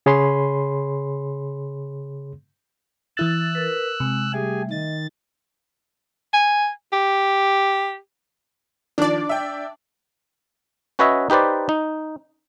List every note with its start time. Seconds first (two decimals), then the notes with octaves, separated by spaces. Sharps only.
0.06 C#3 G#4 C#5 B5 C6
3.17 E3 E4 E6 F#6 A6
3.55 A#4 B4
4.00 C3 G#3
4.33 G3 A3 G4 G#4 E5 G#5
4.71 D#3 D#5 A6
6.34 G#5
6.93 G4
8.98 D#3 F3 D4 D5
9.29 E5 G5
10.99 C#4 F#4 B4 C#5 D#5 E5
11.30 D#4 G4 B4 C5 D5
11.69 D#4